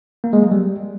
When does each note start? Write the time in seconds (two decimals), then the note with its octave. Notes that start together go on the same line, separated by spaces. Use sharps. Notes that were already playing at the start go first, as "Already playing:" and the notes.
0.24 A#3
0.33 G#3
0.42 F#3
0.51 G3